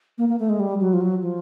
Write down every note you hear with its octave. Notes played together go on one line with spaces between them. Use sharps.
A#3
A#3
A3
G#3
G3
F#3
F3
F#3
F3